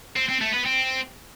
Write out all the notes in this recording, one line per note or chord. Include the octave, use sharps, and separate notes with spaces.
C4
C4
A3
B3
C4